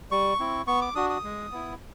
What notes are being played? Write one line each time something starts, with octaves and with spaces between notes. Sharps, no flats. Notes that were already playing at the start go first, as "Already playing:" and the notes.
G3 C#6
C4 E4
B3 C#6
D6
D4 F#4 D#6
D#6
G#3
B3 E4